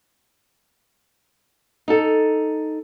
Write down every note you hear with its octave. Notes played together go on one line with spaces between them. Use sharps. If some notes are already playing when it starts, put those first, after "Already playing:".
D#4 A4